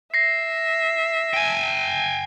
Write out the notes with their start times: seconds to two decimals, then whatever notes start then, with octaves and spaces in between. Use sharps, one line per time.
0.14 E5 A#6 C7
1.33 G5 G#5